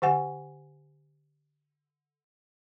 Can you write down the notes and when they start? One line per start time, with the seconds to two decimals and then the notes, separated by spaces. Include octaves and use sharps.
0.02 D3 G4 F#5 G#5